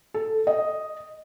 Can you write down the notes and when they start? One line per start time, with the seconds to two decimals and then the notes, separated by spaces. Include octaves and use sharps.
0.14 A4
0.47 D#5